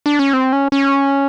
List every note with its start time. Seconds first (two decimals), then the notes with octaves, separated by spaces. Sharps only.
0.06 D4
0.19 C#4
0.33 C4
0.52 C#4
0.72 C#4